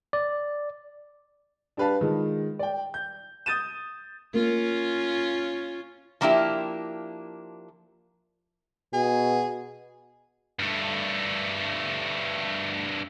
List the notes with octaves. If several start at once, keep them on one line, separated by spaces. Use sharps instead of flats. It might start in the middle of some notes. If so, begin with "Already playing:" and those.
D5
D4 G4 B4 F5 A5
D#3 G#3 F4
D5 G5
G6
D#6 G6 A6 D#7 E7
A#3 C#4 F4
F3 A#3 D4 E4 G4
B2 G#4
G2 A3